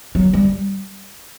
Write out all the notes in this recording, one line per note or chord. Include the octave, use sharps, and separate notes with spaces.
F#3
G3